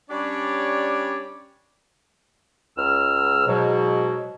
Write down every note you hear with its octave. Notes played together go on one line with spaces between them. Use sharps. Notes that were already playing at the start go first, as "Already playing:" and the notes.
G3 C#4 D4 G4 C#5 D5
C#2 E6 F6
G#2 B2 F#3